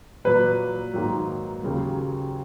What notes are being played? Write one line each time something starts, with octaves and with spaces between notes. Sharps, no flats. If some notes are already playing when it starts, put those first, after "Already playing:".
A#2 F#3 A#3 B4
G#2 D#3 F#3 A#3
D#2 C#3 F#3 A#3